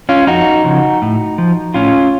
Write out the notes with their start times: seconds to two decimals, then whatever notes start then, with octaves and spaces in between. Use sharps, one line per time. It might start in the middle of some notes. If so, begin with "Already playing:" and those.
0.09 C#4 F4
0.27 F2 D#4 F#4
0.64 C#3 F3
1.02 A2
1.38 F3
1.74 A2 C#4 F4